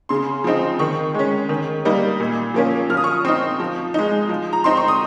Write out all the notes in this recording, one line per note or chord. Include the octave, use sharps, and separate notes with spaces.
C#3 C6
F3 C4 D#4
D#3 C#6
G#3 C#4
D#3
G3 A#3 D#4
A#2
F3 A#3 C#4
F3 F6
D#6
C#6
D#6
C4 D#4
F3
G#3 D#4
F3
A#5
C4 D#4 C6
C#6
D#6